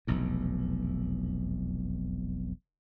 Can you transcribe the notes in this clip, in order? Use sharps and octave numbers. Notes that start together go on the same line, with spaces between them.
F1 B1 E2